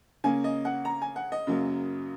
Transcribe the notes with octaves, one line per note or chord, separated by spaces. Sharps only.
C#3 A#3 C#4 G#5
D#5
F#5
A#5
G#5
F#5
D#5
F#2 C#3 F#3 A#3